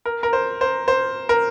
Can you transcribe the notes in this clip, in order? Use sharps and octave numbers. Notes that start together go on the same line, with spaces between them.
A#4
A#4
C5
C5
C5
A#4